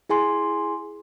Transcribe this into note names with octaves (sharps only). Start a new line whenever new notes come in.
E4 G#4 G#5 C6